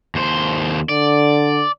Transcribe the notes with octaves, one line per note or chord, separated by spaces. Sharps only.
D#2 C5
D3 D5